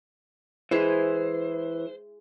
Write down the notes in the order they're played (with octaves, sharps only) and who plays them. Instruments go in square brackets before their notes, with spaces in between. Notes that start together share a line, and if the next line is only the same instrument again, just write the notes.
[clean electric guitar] E3 [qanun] G#3 E4 G#4 [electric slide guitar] C5